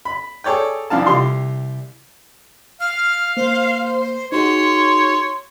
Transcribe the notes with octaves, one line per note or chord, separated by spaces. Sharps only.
B5
G#4 A4 C#5 D5 G5
F2 E3 D4 F5 A5
C2 G4 C6
F5 F6
A#3 C5
D#4 F#4 G#4 C#5 C6